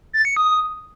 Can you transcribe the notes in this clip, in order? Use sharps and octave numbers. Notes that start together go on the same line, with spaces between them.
A6
C#7
D#6